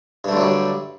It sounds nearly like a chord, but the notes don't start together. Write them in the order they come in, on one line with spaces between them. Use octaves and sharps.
G2 A3 D3 F#3 G3